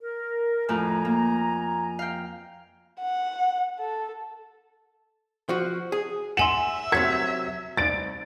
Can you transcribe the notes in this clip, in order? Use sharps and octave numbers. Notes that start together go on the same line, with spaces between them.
A#4
F2 A2 G#5 A#5
A#3
F5 G5
F#5
A4
F3 F#4
G#4
E5 F#5 G#5 C6 E7 F#7
C3 F#3 A#4 F#5 G#6 B6
C2 A6 D7